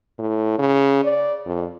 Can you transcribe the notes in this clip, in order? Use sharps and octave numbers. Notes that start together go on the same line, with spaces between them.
A2
C#3
D5
F2